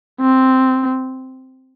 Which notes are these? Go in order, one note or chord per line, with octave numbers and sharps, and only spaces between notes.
C4